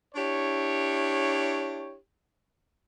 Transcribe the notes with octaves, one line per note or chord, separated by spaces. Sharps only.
D4 E4 G4 C#5